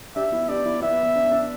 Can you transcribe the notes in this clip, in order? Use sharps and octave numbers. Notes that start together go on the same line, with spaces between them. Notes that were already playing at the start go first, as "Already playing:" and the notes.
D4 G4 E5
B3 E4
D4 G4 D5
B3 E4
B3 E4 E5
B3
D4
D4